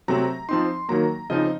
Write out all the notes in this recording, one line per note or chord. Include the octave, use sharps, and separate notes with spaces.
C3 F#3 A3 C4 A#5
F3 C4 D#4 C6
D#3 F#3 A#3 A#5
C#3 F3 C4 D#4 D#5